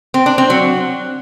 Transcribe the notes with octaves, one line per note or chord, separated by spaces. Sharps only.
C4
D4
C4
F#3